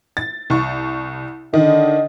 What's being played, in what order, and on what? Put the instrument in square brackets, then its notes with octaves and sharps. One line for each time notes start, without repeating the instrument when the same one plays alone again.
[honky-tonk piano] A6
C2 C#6
[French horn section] D3 D#5 [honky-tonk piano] D#3